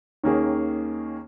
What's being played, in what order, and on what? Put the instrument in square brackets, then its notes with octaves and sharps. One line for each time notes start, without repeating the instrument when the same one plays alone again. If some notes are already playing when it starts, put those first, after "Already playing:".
[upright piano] D#2 D#3 A#3 C#4 G#4